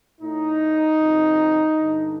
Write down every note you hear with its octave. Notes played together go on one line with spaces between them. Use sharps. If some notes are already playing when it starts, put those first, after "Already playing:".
A2 D#4
F2 C3 D#3
G2 D3